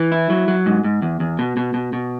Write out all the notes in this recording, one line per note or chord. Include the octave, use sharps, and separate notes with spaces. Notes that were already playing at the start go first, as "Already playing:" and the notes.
Already playing: E3
E4
F#3
F#3
G#2
G#2
E2
E2
B2
B2
B2
B2